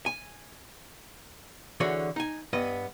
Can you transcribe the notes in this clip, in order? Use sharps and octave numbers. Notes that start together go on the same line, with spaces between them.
G#5
D3 E3 F#4 G#4 C#5
D#4 G#5
G2 B3 D#5